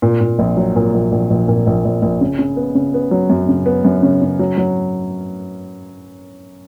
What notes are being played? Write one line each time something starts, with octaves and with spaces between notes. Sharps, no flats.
A#2
A#2
A#1
F#3
A#2
A#1
A#1
A#1
A#2
A#1
A#1
A#1
C#3
C#3
B3
C#3
B3
F#3
F#2
C#3
B3
F#2
C#3
C#3
F#3
F#3